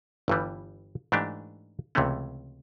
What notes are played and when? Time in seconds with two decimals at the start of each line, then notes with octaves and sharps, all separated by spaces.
0.28 G1 G2 E3 G3
1.12 G#2 E3 A3 D4 G4
1.95 C#2 C3 E3 A3 C#4